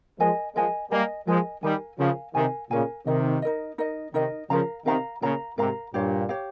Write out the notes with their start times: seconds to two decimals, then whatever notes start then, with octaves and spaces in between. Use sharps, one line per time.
0.19 F3 G#3 A#4 D#5 G#5
0.55 F3 G#3 A#4 D#5 G#5
0.91 G3 A#3 A#4 D#5 G#5
1.27 F3 G#3 A#4 D#5 G#5
1.63 D#3 G3 A#4 F5 G#5
1.99 C#3 F3 A#4 F5 G#5
2.34 C3 D#3 A#4 F5 G#5
2.71 A#2 C#3 A#4 F5 G#5
3.06 C3 D#3 D#4 A#4 D#5
3.42 D#4 A#4 D#5
3.78 D#4 A#4 D#5
4.14 C3 D#3 D#4 A#4 D#5
4.50 C#3 F3 A#4 F5 A#5
4.86 C3 D#3 A#4 F5 A#5
5.22 A#2 C#3 A#4 F5 A#5
5.58 G#2 C3 A#4 F5 A#5
5.94 G2 A#2 G4 C#5 F5
6.29 G4 C#5 F5